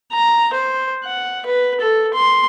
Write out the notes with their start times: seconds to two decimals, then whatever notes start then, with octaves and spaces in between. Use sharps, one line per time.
0.13 A#5
0.53 C5
1.04 F#5
1.46 B4
1.81 A4
2.14 C6